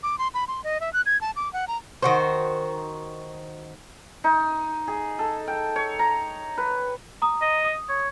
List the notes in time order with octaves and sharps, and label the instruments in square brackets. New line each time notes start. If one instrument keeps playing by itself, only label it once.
[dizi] D6
C6
B5
C6
D#5
E5
F#6
G#6
A5
D6
F#5
A#5
[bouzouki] D#3 F#4 C5
[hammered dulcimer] D#4
G#4
A4
G5
C#5
A#5
B4
[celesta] A#5 D#6
[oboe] D#5
[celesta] D#6
[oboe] C#5